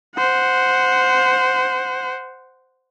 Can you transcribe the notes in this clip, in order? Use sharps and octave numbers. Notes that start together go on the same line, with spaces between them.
C5 F#5